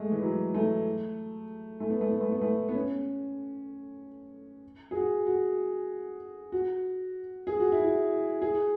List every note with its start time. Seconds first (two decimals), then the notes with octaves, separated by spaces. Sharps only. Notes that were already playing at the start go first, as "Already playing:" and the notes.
Already playing: G#3 A3
0.12 E3
0.23 F#3
0.54 A3
1.80 A3
1.90 B3
2.01 A3
2.11 B3
2.21 A3
2.32 B3
2.42 A3
2.69 B3
2.74 C#4
4.91 G#4
4.95 F#4
5.27 F#4
6.52 F#4
7.47 G#4
7.60 F#4
7.72 E4
7.85 F#4
8.42 G#4